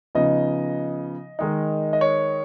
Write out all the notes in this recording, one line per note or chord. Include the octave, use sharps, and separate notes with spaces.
C#3 F3 B3 D#4 D#5
D#3 G#3 D#4
D#5
C#5